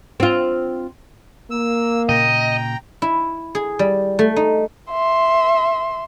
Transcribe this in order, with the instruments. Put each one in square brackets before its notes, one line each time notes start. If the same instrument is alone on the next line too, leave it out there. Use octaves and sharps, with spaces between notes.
[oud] C4 F4
[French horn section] A#3 [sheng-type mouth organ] E6
[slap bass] A#2 C#3 [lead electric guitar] D#5 [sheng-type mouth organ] G5 A#5
[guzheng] E4
G#4
G3
A3
D#4
[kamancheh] E5 C6